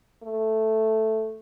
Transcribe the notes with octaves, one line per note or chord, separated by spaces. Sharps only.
A3